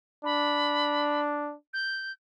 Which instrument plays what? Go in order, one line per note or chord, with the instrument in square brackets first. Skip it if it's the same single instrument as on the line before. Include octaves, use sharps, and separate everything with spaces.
[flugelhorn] D4 [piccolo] B5
[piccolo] G6